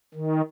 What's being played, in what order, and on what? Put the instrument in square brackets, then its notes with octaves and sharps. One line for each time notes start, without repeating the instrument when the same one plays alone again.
[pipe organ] D#3